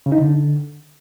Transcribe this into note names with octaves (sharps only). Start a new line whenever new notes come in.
C#3
D#4
D3